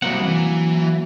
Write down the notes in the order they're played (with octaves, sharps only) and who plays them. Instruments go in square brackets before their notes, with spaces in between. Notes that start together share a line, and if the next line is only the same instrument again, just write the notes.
[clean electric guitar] F#3 A#3 F#5 [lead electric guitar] G3 C4
[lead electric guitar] E3